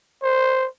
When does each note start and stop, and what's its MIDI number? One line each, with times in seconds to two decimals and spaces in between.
0.23 0.67 72